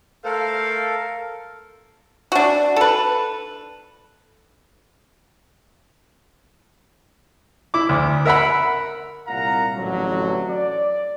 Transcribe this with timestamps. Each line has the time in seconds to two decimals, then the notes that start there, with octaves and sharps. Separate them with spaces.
0.25 A3 A4 A#4 C5 F5
2.32 D4 F#4
2.76 A4 B4
7.74 E4 D6
7.89 D2
8.25 A#4 E5 F#5 B5
9.27 C2 A#2 F5 F#5 A#5
9.76 A1 F2 D3 F#3
10.50 D5